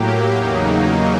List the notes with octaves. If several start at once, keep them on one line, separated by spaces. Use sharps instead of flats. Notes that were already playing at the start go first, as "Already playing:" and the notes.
Already playing: A2 F#3 A#3 G4
E2 C#3 F#3 A#3 D#4